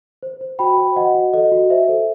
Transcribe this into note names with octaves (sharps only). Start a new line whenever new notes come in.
C5
C5
F#4 G5 B5
C5
F#4 D#5 F#5
F#4
A4 D#5
F#4
C5 E5
A4